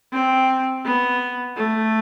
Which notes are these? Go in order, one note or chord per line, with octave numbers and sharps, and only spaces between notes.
C4
B3
A3